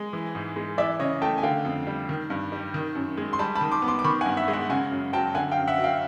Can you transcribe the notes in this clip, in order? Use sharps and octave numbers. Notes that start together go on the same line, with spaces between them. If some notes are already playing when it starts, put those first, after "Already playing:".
Already playing: G#3
E3
G#2
G#3
E3 D5 E5
C#3 C#5 D#5
A3 G5 A5
G#5
D3 F5 G5
F2
G3
D#3
G2
G3
D#3
F#2
G#3
C6
G3 A5 B5
A5 B5
D#3
C6 D6
B3
C6 D6
D6
D#3 B5 C#6
F#5 G#5
G2
E5 F#5
G#3
E5 F#5
C#3 F#5 G#5
F#2
F#3 G5 A5
D3 F#5 G#5
F5 G5
F#2
E5 F#5
F#3
F5 G5